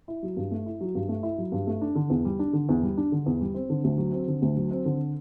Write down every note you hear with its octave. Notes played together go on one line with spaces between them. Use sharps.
E4
F#3
G2
A3
E4
F#3
G2
A3
E4
F#3
G2
A3
D4
D3
E2
G3
D4
D3
E2
G3
D4
D3
E2
G3
C4
D3
D2
F#3
C4
D3
D2
F#3
C4
D3